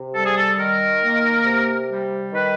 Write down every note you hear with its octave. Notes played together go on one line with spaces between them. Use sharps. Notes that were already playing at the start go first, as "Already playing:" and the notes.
Already playing: C3
G3 A4
G#4
A4
D#3 A#4
A#3
C3
G3
D#3 B4